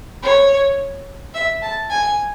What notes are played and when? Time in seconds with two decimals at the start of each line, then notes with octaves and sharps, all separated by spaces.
0.23 C#5
1.34 E5
1.62 A5
1.90 G#5